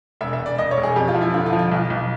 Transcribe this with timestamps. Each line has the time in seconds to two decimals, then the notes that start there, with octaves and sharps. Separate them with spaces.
0.21 E1 E5
0.33 E5
0.40 E1
0.46 D5
0.58 E1 D#5
0.71 C#5
0.77 E1
0.83 G#4
0.96 F2 G4
1.08 F4
1.15 F3
1.21 E4
1.34 D3 F4
1.46 F4
1.53 F3
1.59 F4
1.72 B1
1.90 B1